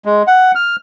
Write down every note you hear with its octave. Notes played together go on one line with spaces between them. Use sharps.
G#3
F#5
F6